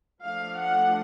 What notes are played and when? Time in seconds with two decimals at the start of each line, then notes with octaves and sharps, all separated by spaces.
0.23 F3 A3 D4 F5
0.59 F#5